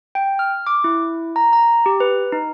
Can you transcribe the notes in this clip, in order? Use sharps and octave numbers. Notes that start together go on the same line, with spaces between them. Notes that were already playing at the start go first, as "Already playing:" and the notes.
G5
F6
D6
E4
A#5
A#5
G4
B4
D#4